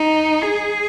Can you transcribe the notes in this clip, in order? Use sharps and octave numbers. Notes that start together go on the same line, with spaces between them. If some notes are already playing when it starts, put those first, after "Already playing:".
Already playing: D#4
G#4